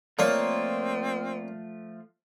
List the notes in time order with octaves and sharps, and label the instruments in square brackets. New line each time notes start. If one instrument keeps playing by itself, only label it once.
[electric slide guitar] F3 A3 F4 [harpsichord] A#3 C#5 [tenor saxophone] C4 [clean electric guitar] D5